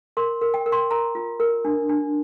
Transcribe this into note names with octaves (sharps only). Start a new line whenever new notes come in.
A#4 C6
A#4
G5
A#4
C6
A#4 A#5
F4
A#4
D4
D4